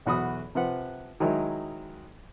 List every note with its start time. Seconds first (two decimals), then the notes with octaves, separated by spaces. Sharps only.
0.06 B1 E2 F#4 B5 D#6
0.55 C3 F3 B4 F#5
1.20 D#3 F#3 G#3 D#4 E4